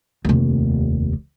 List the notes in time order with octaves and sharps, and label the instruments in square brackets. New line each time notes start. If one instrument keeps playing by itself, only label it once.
[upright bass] F1 D#2